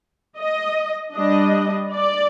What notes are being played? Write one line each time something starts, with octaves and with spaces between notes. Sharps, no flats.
D#5
G3 D4 D#5
D5